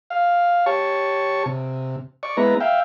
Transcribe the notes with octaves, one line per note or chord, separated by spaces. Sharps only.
F5
G4 C#5 A5 C#6
C3
D5 C#6
G#3 B3 E4 B4 A#5
E5 F5 G5